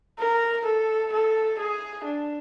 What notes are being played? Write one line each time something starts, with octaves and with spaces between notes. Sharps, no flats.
A#4
A4
A4
G#4
D4